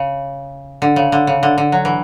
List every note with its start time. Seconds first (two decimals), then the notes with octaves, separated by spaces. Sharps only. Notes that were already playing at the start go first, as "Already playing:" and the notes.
Already playing: C#3
0.82 D3
0.96 C#3
1.12 D3
1.27 C#3
1.43 D3
1.58 D3
1.72 F#3
1.85 E3